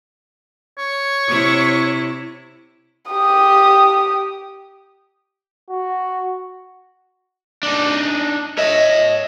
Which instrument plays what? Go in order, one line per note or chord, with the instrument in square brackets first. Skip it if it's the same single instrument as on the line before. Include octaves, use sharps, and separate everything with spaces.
[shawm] C#5
[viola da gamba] C3 E4
[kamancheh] G4 D#6
[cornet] F#4
[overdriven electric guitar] D4 D#4
[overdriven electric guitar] C#5 E5 [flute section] D#5